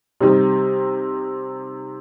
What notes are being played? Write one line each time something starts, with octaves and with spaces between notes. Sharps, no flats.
C3 G3 C4 D#4 G4